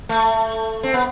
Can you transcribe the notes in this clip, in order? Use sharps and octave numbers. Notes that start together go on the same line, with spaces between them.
A3
C4
B3